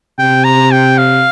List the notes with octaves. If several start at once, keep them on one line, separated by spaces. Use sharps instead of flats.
C3 G5
A#5
G5
F5